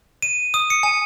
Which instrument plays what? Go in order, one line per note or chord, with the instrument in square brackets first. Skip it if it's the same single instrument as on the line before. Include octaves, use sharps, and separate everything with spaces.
[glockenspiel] D#7
D#6
C#7
G#5